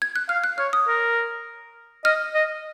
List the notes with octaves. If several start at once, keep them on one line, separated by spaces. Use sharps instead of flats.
G#6
F#6
F5 F6
F#6
C#5 F6
D#6
A#4
D#5 F6
D#5